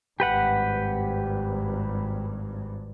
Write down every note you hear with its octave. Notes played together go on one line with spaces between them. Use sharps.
G#1 G2 G4 B4 F#5